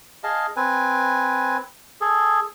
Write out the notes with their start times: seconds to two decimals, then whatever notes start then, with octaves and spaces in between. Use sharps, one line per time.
0.24 G#4 D#5 F5 A5
0.56 C4 B4 G#5
2.01 G#4 A4